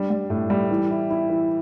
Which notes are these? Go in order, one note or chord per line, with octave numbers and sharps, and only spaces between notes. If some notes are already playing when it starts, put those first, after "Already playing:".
Already playing: G3 D4
G3
A2
G3
E3
E4
E4
E3